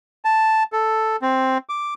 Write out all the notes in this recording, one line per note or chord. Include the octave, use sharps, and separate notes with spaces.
A5
A4
C4
D6